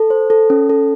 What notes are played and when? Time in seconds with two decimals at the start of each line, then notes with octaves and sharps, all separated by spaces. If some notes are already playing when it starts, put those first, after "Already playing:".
Already playing: A4
0.10 C5
0.30 A4
0.50 C#4
0.69 A4